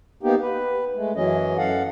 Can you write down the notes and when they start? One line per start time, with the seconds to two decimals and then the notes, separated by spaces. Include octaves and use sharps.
0.23 A#3 B3 D#4 G4
0.42 B4
0.96 G#3 A3
1.16 F#2 E3 F#3 C#4 D#5
1.58 F#2 A4 F5 F#5